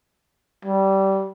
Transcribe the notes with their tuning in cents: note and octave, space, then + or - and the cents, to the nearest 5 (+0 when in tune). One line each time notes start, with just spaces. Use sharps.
G3 -20